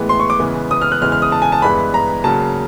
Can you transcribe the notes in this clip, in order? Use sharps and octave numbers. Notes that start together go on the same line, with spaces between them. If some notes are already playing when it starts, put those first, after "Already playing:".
Already playing: A2 E3 G#3 B3
C6
C#6
D6
C#3 E3 G#3 B3
D#6
F6
F#6
E2 C#3 E3 G#3 F6
F6
D#6
A5
G#5
A5
G2 E3 G#3 B3 B5
A#5
C#3 F#3 A#3 A5